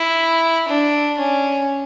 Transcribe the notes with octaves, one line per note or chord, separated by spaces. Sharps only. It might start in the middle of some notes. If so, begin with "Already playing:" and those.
Already playing: E4
D4
C#4